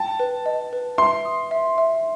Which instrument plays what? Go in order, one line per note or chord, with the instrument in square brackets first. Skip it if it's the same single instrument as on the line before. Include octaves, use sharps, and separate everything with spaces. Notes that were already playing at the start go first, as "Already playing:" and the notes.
Already playing: [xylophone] G5 [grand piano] A5
[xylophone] B4
D#5
B4
[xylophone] E5 [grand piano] C6
[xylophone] D#6
E5
E5